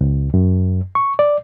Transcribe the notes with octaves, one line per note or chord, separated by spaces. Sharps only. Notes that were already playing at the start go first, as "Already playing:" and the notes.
C#2
F#2
C#6
D5